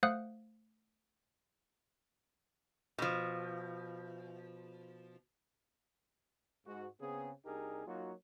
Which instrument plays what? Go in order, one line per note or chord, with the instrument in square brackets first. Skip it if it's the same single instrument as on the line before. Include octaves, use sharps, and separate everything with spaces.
[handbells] A3 C5 F5 F#5 D#6 F#6
[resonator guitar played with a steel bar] B2 F3
[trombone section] G#2 F#4
C#3 B3 C4 G#4
C2 D4 D#4 G4 G#4 A#4
F#3 A#3 D#4 F4 F#4